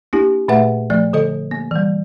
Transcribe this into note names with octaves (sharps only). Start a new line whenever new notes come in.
A#3 D4 E4 G4
A#2 A3 B4 E5 F#5
F3 A3 D5
D3 A4 D#5
A#3
E3 G3